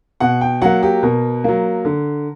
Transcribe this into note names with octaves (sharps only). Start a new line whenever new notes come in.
B2 F#5
G5
F#3 A#3 F#5
G4
B2 A#4
F#3 A#3
D3